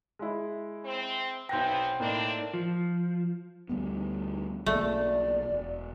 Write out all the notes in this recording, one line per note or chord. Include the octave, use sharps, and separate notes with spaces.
G#3 E4
C4
B1 E3 B3 C4 G5 C6 G6 A#6
A2 A#3 C4 D4 D#4
F3
D2 G3 B3
B1 B2 A3 A#3 D5
E1